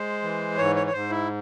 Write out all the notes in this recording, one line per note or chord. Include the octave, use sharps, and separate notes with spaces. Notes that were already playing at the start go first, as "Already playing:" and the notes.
Already playing: G#3 C5
E3
G#2 C#5
C#5
C#5
G#2 C5
E4